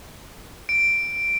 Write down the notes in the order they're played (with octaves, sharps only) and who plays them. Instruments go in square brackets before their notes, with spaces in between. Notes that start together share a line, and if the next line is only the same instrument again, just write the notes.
[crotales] D7